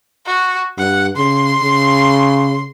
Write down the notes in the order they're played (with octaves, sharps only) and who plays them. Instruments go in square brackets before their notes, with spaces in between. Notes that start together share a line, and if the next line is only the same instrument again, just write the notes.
[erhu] F#4
[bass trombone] G2 [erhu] F#5
[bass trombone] C#3 [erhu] C6
[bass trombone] C#3